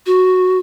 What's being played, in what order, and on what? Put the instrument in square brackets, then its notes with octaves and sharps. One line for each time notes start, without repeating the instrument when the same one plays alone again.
[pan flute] F#4